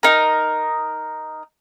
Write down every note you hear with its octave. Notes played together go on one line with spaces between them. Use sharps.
D#4 A#4